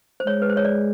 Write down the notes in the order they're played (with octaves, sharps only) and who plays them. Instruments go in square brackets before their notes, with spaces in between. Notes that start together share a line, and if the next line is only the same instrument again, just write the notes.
[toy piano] C5
[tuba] G#3 [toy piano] C#5
[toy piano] B4
C5
C#5
D5